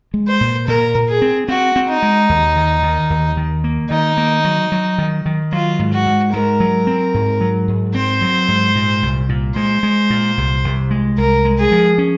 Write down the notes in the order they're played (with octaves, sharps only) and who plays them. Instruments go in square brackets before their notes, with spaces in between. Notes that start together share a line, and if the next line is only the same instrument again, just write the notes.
[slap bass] G#3
[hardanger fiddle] C5
[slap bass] A#2
[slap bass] A#2 [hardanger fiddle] A#4
[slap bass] A#2
[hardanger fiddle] G#4
[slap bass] C4
[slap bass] C4 [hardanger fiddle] F#4
[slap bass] C4
[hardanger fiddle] D#4
[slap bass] G#3
D#2
D#3
D#3
D#2
D#3
A#3
[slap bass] D#3 [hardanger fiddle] D#4
[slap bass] A#3
F#3
F#3
D#3
D#3
[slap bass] F#3 [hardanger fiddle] F4
[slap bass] G#2
[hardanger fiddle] F#4
[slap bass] G#2
[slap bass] G#2 [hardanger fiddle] A#4
[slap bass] F#3
C4
G#2
F#3
G#2
[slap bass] C4 [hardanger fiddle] C5
[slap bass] F#3
G#2
A#2
C2
A#2
[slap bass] G#3 [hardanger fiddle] C5
[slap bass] G#3
A#2
C2
C2
G#3
[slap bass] C2 [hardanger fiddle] A#4
[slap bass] G#3
[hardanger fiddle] G#4
[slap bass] F3
C#4